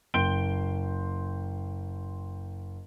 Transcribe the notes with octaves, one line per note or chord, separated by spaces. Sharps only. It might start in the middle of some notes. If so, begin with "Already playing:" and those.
F#1 G5 C6 G6 D7 G7